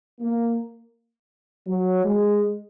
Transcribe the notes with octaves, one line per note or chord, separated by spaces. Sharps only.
A#3
F#3
G#3